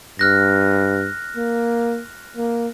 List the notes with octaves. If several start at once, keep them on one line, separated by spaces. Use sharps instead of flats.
G2 F6 F#6 A#6
A#3
A#3